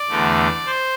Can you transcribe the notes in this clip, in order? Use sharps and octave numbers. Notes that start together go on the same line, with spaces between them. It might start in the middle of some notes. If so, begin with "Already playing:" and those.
Already playing: D5
E2 D3 A3
C5